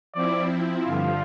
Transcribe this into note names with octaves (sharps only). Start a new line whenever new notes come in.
F3 C4 E4 D5
G2 D3 F3 F4